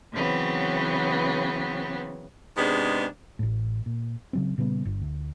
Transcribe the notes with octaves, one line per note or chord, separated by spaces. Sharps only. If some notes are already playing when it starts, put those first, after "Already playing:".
C#3 E3 F#3 B3 C4
G#2 C3 G#3 B3 D4
A1 A2
A#2
C#3 F#3 C4
A#2 C#3 G3 B3
G1
D2